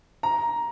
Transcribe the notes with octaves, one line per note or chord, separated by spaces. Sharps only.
A#5